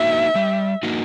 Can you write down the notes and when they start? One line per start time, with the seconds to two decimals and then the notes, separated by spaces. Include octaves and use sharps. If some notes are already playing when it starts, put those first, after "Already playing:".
Already playing: A#3 D#4 F#4 E5
0.35 G3
0.83 A#3 D#4 F#4